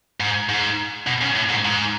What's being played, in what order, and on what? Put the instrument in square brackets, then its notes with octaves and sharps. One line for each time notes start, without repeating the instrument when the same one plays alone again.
[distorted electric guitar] G#2
G#2
B2
C#3
A2
G#2
G#2